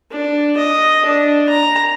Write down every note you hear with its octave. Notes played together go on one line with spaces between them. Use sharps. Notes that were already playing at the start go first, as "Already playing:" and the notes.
D4
D#5
D4
A#5